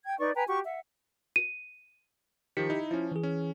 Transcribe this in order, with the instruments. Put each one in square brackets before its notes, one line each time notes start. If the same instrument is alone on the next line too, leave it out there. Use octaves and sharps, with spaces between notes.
[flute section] G5 G#6
D#4 B4 D5 C#6
B4 G5 G#5 A#5
F#4 G4 C#6
E5 F#5
[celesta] D#7
[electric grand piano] D#3 F3 [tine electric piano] G4 B6 C#7
[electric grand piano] D#4 E4
[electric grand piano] F3 C#4 [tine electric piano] E4
[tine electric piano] E3 G#4
[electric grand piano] C#4